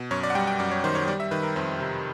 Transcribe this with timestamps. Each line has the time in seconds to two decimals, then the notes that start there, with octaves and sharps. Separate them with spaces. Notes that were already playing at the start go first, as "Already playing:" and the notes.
Already playing: B2
0.11 F#2 C#5
0.23 D5
0.30 F#5
0.35 G3 G5
0.47 G5
0.59 F#2 D5
0.71 C#5
0.84 D#3 C5
0.95 C#5
1.08 G3 D5
1.20 E5
1.31 D#3 B4
1.43 A#4
1.56 F2 C5
1.80 C3